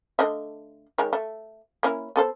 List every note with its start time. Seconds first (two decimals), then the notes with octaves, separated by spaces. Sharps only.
0.19 D3 A3 D#5
0.98 D#3 G#3 C#5
1.13 A3
1.83 A#3 C#4 E4
2.16 B3 A4 C5